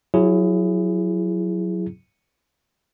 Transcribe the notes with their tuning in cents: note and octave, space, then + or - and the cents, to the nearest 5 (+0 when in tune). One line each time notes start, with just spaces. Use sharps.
F#3 -10 E4 +25 G#4 +0